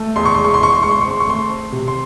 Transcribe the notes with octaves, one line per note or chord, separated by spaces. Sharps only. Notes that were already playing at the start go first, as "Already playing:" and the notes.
Already playing: A3
E2 C6
C#6
G#3 C6
C#6
C6
E2 C#6
C6
G#3 C#6
C6
C4 C#6
C6
C#6
A3 C6
C4
C3
C6